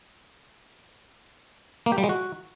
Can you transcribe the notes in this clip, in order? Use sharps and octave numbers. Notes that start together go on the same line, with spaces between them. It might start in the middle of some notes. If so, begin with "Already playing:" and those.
A#3
G4
G3
G#3
F#4